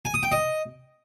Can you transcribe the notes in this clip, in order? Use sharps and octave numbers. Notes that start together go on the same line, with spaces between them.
G#5
D#6
G5
D#5